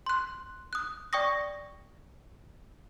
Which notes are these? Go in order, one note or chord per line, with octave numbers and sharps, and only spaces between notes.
C6 F#6
D#6 F#6
D5 G5 C#6 D#6 A#6